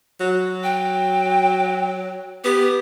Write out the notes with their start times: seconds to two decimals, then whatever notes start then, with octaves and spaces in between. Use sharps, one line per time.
0.20 F#3
0.63 G5
2.45 B3 G4